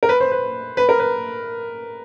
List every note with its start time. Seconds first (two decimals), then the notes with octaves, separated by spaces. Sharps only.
0.03 A#4
0.09 B4
0.20 C5
0.32 B4
0.77 B4
0.89 A#4
1.00 B4